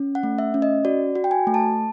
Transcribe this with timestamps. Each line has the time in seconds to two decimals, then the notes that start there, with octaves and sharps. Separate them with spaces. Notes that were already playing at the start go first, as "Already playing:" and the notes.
Already playing: C#4
0.15 F#5
0.23 A3
0.38 E5
0.54 C#4
0.62 D#5
0.85 F#4 D5
1.15 F#4
1.24 G5
1.31 G#5
1.47 A3
1.54 A5